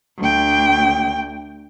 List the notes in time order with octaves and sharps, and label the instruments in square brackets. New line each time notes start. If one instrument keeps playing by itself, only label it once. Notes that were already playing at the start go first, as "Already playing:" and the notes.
[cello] D2 G5